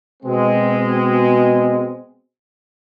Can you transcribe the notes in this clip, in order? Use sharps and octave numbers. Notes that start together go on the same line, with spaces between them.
B2 G#3 C4